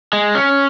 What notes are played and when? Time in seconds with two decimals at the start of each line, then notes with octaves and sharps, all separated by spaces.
0.13 G#3
0.35 C#4